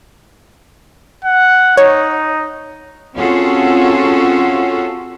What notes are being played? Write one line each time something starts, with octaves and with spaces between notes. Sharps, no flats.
F#5
D#4 C#5
C4 C#4 F4 F#4 G#4 A4